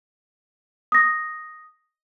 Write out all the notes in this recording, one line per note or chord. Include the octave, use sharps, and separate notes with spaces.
D#6 A#6